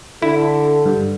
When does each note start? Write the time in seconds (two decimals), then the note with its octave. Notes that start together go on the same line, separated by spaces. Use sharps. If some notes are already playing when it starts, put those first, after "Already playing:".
0.22 D3 E4 A4
0.86 G2